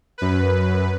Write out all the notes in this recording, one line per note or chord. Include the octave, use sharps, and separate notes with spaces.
F#2 B4